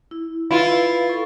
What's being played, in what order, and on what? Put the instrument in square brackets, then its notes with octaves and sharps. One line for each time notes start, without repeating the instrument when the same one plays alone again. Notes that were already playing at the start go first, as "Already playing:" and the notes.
[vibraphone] E4
[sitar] E4 F4 [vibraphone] B4 F5
[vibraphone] A4 C#6